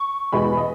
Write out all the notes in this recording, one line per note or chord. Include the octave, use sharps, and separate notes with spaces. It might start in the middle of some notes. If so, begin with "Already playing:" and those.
Already playing: C#6
E2 B2 G#3 B5
D#5